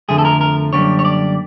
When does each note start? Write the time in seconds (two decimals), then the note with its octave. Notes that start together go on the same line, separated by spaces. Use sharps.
0.09 F2 D3 F3 A3 G#4
0.18 A4
0.25 A#4
0.41 A#4
0.73 F#2 D3 G3 A#3 C#5
0.99 C#5
1.05 D5